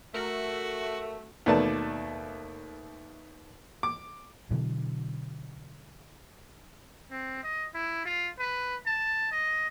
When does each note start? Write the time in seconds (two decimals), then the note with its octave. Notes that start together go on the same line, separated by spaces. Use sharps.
0.14 A3 F#4 A#4
1.46 D#2 B2 A3 B4 D5 A5
3.83 D6
4.51 B2 D3 E3 F#3
7.11 C4
7.43 D#5
7.75 E4
8.06 F4
8.39 B4
8.86 A5
9.32 D#5